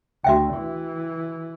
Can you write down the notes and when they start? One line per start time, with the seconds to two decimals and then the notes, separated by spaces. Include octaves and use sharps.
0.24 D2 F#4 E5 G5
0.54 E3